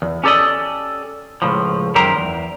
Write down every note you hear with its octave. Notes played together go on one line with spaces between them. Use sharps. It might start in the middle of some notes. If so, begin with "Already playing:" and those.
E2
C#4 G4 A4 D5 D#5
C#2 A2 F3
F#2 D#3 G4 A#4 C5
E2